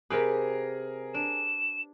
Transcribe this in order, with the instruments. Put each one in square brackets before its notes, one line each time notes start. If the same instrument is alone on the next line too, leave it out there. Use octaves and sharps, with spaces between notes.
[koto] C3 G4 B4 [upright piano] G#4 A#4
[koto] D4 [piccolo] E7